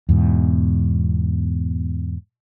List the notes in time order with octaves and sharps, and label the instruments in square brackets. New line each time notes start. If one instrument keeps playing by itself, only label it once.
[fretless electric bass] E2 G#2 B2